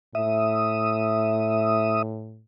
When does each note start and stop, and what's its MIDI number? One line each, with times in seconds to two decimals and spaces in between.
0.15 2.43 45
0.15 2.03 76
0.15 2.03 87